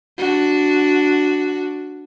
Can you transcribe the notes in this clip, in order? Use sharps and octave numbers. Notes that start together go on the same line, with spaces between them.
D4 F#4